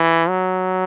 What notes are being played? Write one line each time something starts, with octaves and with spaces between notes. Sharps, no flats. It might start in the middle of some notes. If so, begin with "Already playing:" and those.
Already playing: E3
F#3